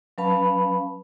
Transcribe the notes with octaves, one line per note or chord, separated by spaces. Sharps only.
F#3 C#4 B4 F5 A5 B5